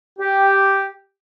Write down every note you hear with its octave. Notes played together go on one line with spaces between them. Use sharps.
G4